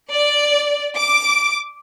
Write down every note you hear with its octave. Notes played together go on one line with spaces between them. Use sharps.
D5
D6